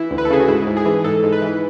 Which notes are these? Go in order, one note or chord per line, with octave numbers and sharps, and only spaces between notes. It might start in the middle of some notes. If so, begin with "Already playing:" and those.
Already playing: E3 E4
D2
B4
A4
C#3 G#4
F#4
G#2 E4
G#2
G#4
E3
G#2 A4
G#2
B4
E3